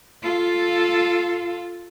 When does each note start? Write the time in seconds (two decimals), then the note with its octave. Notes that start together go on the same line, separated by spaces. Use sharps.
0.23 F4 A4